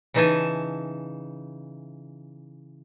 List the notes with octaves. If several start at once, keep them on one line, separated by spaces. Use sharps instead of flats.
C#3 E3 D#4 E5 G#5 A5